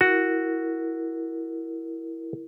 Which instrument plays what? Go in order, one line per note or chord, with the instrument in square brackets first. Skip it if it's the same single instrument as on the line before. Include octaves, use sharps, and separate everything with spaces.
[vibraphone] E4 A#4 [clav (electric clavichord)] F#4